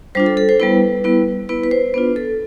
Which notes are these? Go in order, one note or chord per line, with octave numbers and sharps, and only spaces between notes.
G3 D4 F4 C5
A4
A4
C5
G3 B3 E4 B4
G3 B3 E4
B3 E4 B4
B4
C5
B3 D4 F4 B4
A4